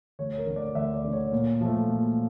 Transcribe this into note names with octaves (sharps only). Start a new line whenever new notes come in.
D2 C#5
A#4
D3
A3 D5
D2 E5
D5
D3 A3
C#5
A#2
F3 A3
A#2